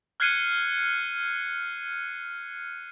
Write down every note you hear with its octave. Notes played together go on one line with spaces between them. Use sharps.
F6 F#6 G#6 C7 C#7 D#7